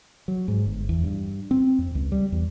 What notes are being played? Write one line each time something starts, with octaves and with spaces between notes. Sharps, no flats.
F#3
G#2
G1
E2
G2
C4
F2
C#2
G3
E2